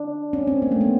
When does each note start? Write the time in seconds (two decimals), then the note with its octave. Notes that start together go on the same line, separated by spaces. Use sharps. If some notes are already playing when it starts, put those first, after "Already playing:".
Already playing: D4
0.33 C#4
0.47 C4
0.62 A#3
0.72 A3
0.81 B3